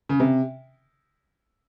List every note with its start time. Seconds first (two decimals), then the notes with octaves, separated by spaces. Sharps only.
0.09 C#3
0.20 C3